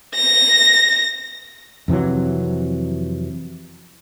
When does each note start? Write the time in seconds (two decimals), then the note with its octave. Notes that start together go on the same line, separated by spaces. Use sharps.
0.15 A#6
1.88 F2 C3 E3 F#3